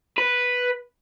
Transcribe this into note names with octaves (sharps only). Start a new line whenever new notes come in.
B4